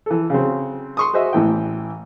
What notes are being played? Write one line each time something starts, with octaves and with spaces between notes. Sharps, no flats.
E3 A4
C#3 F#3 C4
C6 C#6 D#6
F#4 G#4 C5 D#5 E5
A1 A2 E3 G5